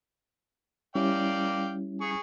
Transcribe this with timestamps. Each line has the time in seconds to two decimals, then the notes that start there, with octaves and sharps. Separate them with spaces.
0.95 G3 C#4 E4 D5 F5 G5
2.01 G#4 C#6